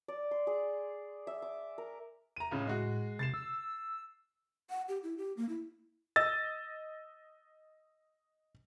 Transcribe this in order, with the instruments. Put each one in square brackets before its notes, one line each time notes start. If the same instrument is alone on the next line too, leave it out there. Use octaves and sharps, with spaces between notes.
[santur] D5
C6
G#4
E5
D6
A#4
[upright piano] A#5 D#7
[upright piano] C#2 C#3 C#4 [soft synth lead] A2
[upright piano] G#3 F#4
[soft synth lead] C3 [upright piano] A6 C7 E7
[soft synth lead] E6
[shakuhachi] F#5
G4
E4
G4
A#3
E4
[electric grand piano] D#5 E6 A6